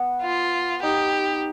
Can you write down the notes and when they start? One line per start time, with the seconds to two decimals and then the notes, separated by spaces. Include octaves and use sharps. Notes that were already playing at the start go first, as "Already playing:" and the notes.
Already playing: B3
0.22 F4
0.83 D#4 G4